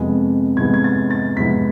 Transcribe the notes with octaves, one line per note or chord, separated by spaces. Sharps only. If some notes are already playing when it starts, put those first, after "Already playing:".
Already playing: F2 C3 G#3 B3
F2 C3 G#3 B3 G#6
G#6
A6
A6
F2 C3 G#3 B3 B6